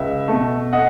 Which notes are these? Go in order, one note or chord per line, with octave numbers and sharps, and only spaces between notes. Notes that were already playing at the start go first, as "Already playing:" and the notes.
Already playing: C#2 E5
B2 A3
D#5 F#5